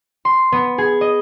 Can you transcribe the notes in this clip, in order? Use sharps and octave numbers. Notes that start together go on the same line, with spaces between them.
C6
B3
G#4
D#5